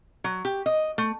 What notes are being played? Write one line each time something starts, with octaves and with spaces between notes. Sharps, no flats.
F#3
G4
D#5
A3